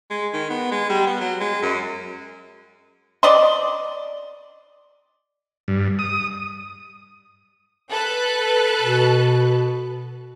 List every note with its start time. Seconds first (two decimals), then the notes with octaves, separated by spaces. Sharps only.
0.11 G#3
0.33 D#3
0.50 B3
0.71 G#3
0.89 G3
1.07 B3
1.21 F#3
1.40 G#3
1.62 F#2
3.23 D5 D#5 C6
5.68 G2
5.99 D#6
7.91 A4 B4 F#6
8.81 B2